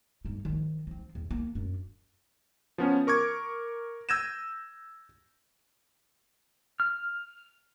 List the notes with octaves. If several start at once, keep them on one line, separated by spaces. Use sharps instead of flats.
G1 D#4
D#3 F3
F3 C4
E2
A#3 B3
F#2 D4
F3 B3 C#4
A#4 C#6 D6 G#6
E6 G6 G#6 A#6 D#7 E7
F6